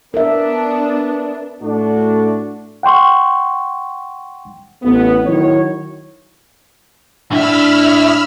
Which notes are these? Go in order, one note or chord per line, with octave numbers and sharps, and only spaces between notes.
B3 D4 A#4 E5
A2 A3 D4 F#4
F#5 G5 C6 C#6
A1 B3
D#3 F#3 E4 F#4 C#5
A2 D4 E5 B5 E6 F6